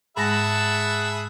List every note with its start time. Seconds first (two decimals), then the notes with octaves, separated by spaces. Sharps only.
0.17 G#2 G#3 G#4 E5 F#5 A5 B5 A#6